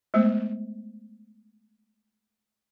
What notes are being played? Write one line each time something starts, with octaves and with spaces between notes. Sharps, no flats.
G#3 A3 B3 C5